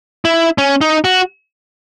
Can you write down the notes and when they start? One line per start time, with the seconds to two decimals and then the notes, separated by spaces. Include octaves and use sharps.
0.25 E4
0.58 C#4
0.81 D#4
1.05 F#4